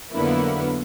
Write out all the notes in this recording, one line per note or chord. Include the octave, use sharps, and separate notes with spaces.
F2 D3 F#3 A#3 B3 E4